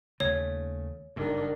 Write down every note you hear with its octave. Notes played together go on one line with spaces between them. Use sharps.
D#2 C#3 A3 C#5
F#1 G2 D#3 D4